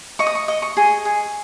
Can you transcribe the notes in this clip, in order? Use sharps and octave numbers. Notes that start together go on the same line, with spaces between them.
D#5 C#6
D#6
C#6
D#5
C#6
G#4
G#4